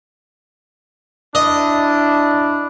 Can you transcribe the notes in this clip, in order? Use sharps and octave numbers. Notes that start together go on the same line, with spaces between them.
D4 E4 D#5